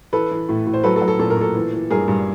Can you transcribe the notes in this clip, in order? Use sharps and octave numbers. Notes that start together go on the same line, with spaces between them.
E3 A4 B4
E3
A2
A2
C5
F#3 A4 B4
A4
F#3
A4
A#2 A4
A#4
A#2 A4
E3
E3
G2 G#4 A#4
G2